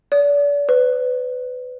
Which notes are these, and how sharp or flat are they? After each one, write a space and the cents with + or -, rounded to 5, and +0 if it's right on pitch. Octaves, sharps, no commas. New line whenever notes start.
D5 -35
B4 +30